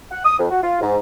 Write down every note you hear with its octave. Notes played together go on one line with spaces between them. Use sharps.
F#5
D#6
F2
F#4
F4
G#2